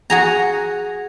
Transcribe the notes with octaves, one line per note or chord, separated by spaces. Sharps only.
F#4 G#4 A#5